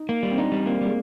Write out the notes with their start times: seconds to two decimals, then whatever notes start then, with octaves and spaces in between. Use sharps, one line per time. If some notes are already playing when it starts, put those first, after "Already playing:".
Already playing: D#4
0.09 A#3
0.23 G3
0.31 C4
0.37 D4 D#4
0.52 G3
0.66 A#3 C4
0.81 G3 G#3